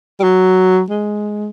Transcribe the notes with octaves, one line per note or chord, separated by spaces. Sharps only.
G3
F#3
G#3